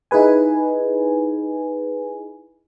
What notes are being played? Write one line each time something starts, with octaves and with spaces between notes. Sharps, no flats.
D#4 E4 G#4 B4 G#5